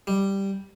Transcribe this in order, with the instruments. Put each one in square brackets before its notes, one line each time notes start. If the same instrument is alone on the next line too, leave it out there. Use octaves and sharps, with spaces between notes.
[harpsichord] G3